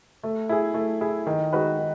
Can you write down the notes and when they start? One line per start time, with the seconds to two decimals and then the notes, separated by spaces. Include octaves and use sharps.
0.23 A3
0.49 E4 G#4
0.74 A3
1.01 E4 G#4
1.27 D#3
1.53 G#3 D#4 F#4 B4
1.79 D#3